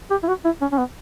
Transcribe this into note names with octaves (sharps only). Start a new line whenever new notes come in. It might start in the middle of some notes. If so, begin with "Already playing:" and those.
G4
E4
F#4
E4
C#4
C#4
B3